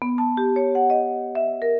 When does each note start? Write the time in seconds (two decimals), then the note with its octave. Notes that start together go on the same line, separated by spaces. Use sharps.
0.02 B3
0.18 A5
0.37 G4
0.56 C#5
0.75 F#5
0.90 D#5
1.35 E5
1.62 A#4